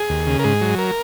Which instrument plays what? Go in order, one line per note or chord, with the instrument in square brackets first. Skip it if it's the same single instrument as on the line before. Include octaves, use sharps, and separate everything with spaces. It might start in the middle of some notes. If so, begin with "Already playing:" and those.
Already playing: [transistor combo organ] G#4
D#2
C#3
A#4
G#2 G#4
F#3
A#4